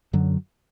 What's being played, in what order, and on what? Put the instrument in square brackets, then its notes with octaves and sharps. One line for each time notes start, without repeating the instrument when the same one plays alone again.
[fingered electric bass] F#2 D3 F#3